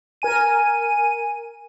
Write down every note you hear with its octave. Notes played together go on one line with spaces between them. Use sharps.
A#4 G#5 D#7